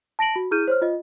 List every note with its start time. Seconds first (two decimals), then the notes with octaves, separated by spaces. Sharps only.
0.19 A5 A#6 D7 F#7
0.36 F#4
0.51 E4 G#4 F6 G6 D#7
0.68 C5 C#5 F6
0.82 F4 D#5